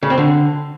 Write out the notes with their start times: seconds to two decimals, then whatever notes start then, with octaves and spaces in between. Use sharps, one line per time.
0.03 C#3
0.10 C4
0.18 D3